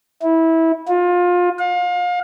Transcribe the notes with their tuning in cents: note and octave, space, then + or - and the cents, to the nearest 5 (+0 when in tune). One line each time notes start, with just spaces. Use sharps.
E4 -20
F4 +25
F5 +35